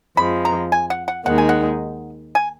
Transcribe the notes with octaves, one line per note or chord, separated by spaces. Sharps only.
F2 F3 G#3 B5
A#5
G#5
F#5
F#5
D#2 D#3 G#3 D#4 F#5
G#5
F#5
G#5